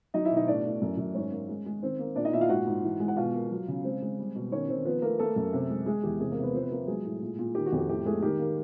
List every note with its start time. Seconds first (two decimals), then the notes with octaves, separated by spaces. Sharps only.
0.14 F#3 D#4 D#5
0.25 E4 E5
0.30 B2
0.37 D#4 D#5
0.47 A2 D4 D5
0.65 A2
0.82 F#2
0.98 F#2
1.14 G#2 C#4 C#5
1.31 A#3
1.49 G#3
1.66 G#3
1.82 D#3 C4 C5
1.99 A#3
2.15 A#2 D4 D5
2.25 D#4 D#5
2.33 A#2 E4 E5
2.41 F4 F5
2.49 G#2 F#4 F#5
2.67 G#2
2.84 E3
3.00 G#3
3.08 F#5
3.17 B2 F4 F5
3.34 A#3
3.51 F#3
3.68 C#3
3.84 G#3 C4 C5
4.02 G#3
4.19 G3
4.35 B2
4.51 D#3 C#4 C#5
4.69 D#3 C4 C5
4.85 F3 B3 B4
5.02 A3 A#3 A#4
5.19 A3 A#3 A4
5.36 F#2
5.53 C3
5.70 G#3
5.86 G#3 G#4
6.03 E2 G4
6.20 C3 G#3 G#4
6.31 A#3 A#4
6.38 C3
6.43 B3 B4
6.54 F3 C4 C5
6.62 B3 B4
6.71 F3 A#3 A#4
6.87 F#3 G#3 G#4
7.05 A2
7.22 A#2
7.39 A#2
7.55 D#3 G4
7.66 F#4
7.72 F2
7.78 G4
7.89 A2 G4
8.05 G#3 A3 G#4
8.22 D#3 G4
8.39 A#3